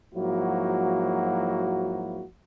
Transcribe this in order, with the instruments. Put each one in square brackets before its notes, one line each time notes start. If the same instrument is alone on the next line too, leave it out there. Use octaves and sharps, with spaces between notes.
[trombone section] G#2 F3 F#3 A#3 E4 F#4